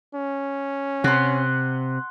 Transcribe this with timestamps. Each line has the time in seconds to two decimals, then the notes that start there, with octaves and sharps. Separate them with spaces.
0.15 C#4
1.04 C3 F#5 C6